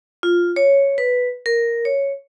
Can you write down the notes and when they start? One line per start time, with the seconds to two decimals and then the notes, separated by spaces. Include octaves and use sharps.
0.23 F4
0.56 C#5
0.98 B4
1.46 A#4
1.85 C#5